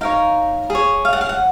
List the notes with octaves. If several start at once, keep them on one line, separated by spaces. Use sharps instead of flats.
D#4 A#4 C#5 F5
G#4
C#5
F5
F#5
F5
F#5